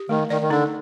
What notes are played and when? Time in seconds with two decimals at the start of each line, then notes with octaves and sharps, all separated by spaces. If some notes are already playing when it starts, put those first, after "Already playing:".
Already playing: G4
0.09 D#3 A3
0.30 D#3 D5
0.42 D#3
0.50 D3 D#4